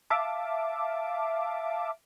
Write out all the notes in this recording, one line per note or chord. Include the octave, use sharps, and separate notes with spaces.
E5 F5 A5 D6